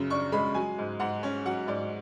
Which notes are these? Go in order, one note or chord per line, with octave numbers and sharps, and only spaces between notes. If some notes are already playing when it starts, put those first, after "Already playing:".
Already playing: F#2 C#3
D4 C#6
G#3 B5
F#3 G#5
G#2
G#2 F#5
C#4
F#3 F#5
G#2 D5